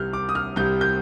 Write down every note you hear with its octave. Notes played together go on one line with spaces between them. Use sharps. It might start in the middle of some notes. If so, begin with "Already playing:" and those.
Already playing: C2 C3 G3 F6 G6
D6
D#6
F6
C2 C3 G3 G6
G6